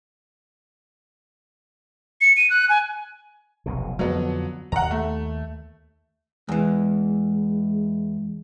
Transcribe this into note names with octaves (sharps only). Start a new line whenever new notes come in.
C#7
D#7
F#6
G#5
F1 B1 B2
F2 D3 F3 F#3 B3
D#2 F#5 A#5
A3
E2 E3 G#3